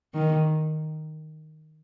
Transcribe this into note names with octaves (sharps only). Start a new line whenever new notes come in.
D#3